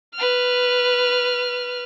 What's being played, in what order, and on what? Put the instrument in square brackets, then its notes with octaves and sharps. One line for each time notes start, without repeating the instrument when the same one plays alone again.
[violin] B4 F6